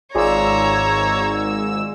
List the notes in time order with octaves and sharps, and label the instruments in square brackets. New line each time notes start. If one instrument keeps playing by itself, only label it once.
[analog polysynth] G#1 G#2 E6 [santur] F4 G#4 D5 [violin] C#5 A#5